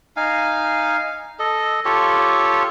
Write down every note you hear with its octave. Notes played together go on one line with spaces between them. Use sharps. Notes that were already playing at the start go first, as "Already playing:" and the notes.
D#4 F5 G#5
A4 D#5
F4 G4 A4 C#5